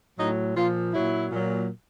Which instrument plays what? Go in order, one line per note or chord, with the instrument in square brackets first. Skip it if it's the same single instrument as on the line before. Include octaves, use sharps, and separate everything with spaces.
[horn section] A2 F#3 D#4
A#2 F3 F4
A#2 F#3 E4
A#2 F#3